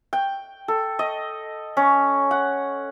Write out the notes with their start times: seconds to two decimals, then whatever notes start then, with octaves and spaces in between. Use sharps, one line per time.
0.13 G5
0.68 A4
0.99 D#5
1.77 C#4
2.31 F#5